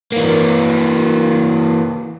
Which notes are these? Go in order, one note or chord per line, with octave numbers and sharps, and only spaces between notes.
E3 A#3